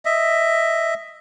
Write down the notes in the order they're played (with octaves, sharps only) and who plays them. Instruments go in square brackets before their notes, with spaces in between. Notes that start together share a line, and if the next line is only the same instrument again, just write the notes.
[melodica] D#5 E5